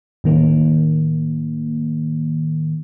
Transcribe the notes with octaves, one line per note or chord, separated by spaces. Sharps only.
A2 D#3 A#3